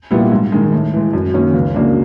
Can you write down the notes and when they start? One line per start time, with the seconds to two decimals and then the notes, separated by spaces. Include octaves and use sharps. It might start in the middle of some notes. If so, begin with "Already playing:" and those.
0.11 A#2 G3 B3 E4
0.31 G#2
0.52 D#3 G#3
0.72 A2
0.93 E3 G#3
1.13 F#2
1.34 D#3 F#3 A#3 C#4
1.54 C#2
1.74 C#3 F#3 A#3 D4